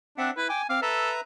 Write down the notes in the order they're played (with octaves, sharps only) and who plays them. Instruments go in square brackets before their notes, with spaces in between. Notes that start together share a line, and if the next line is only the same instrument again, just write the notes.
[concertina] C4 E5 F#5 [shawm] D4
[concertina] E4 [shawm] B4
[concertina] G5 D6 [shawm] G#5
[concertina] C4 D6 [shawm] F5
[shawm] A4 [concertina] B4 E5 A#5